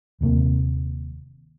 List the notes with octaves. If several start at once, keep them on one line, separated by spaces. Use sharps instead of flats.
D#1 D#2 C3 A#3